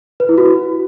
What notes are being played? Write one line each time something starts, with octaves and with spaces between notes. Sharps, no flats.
B4
E4
F#4